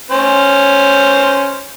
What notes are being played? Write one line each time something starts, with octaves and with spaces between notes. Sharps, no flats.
C#4 C5